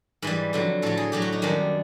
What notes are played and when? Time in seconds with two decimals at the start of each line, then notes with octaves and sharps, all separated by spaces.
0.22 G#2 E3 G3 B4
0.53 F2 D3 F#3
0.82 A2 F#3 A4
0.97 G#4
1.12 A2 F#3 G4
1.22 F#4
1.32 D#4
1.42 F#2 D#3 G3 D4